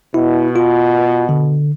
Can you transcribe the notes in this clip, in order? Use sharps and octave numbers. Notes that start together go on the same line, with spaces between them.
B2 E4
F4
D3